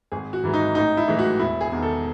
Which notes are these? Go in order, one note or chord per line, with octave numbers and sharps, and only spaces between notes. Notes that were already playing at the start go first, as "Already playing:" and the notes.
G#1 G#4
F#4
G#2 E3 G#3
D#4
A1 D#4
E4
A2 E3 G#3
F#4
E1 E4
G#4
E2 D#3
A4